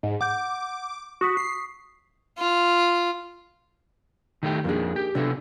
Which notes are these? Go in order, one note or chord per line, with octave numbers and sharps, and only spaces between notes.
G#2
F#5 D6 G6
F#4 C#6 D#6 B6
C7
F4
D#3 A3 G4
F2 A#3 D4 D#4 G#4
G4
C3 B3 D4 F4 A4 E5